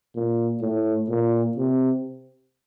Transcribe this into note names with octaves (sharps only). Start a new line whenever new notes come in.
A#2
A2
A#2
C3